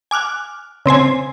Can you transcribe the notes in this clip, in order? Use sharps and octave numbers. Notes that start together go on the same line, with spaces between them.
G#5 D6 F6 F#6
C#3 C4 C5 G#5